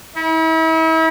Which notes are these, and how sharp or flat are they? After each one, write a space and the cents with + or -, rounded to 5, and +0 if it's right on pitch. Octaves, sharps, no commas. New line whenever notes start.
E4 -40